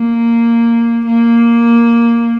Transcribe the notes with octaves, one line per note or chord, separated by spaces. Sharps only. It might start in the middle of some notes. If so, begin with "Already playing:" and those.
Already playing: A#3
A#3